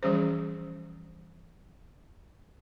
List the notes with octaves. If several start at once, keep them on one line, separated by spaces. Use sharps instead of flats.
E3 F3 G3 C#4 G#4 C5